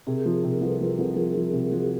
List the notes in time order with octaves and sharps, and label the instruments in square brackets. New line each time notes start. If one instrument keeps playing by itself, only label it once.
[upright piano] C3 [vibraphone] G#4 A#4
[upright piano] F3
C3
[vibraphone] A#4
[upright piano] C2 [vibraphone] A4 B4
[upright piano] F3
C2
[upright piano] F3 [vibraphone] G#4 A#4
[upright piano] F3
C3
[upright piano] F3 [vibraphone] F#4 G#4